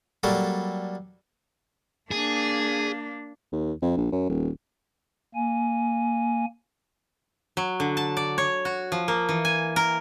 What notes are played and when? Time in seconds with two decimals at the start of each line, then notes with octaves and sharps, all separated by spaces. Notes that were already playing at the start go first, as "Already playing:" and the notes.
0.23 F#3 G3 A#3 A4
2.11 A#3 D4 G#4
3.52 D#2
3.82 F2
3.97 A#1
4.12 F#2
4.29 D#1
5.35 A#3 G#5
7.57 F#3
7.80 D3
7.97 A5
8.17 D5
8.38 C#5
8.65 F#4
8.92 F3
9.08 A#3
9.29 E3
9.45 G#5
9.76 A#4